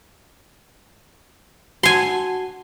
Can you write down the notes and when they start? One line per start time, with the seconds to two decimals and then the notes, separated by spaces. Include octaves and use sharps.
1.83 F#4 F#5 G#5 A5 C6